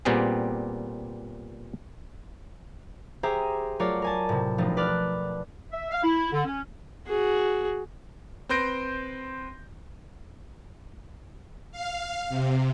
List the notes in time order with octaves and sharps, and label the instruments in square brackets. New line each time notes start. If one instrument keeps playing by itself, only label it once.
[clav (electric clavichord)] A#2 G3 B3 C4 G4 G#4
[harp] G4 G#4 C5 E5 G#5 A#5
F#3 A3 F4 A#4 C#5 D5
A#4 G#5 A5
A2 C3
E1 B2 F3 A3 D#4
B4 D5 F6 F#6
[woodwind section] E5
F5
E4
D3
C#4
[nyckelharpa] F#4 G#4
[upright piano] C4 B4 C6 G6 A#6 D7
[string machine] F5
C3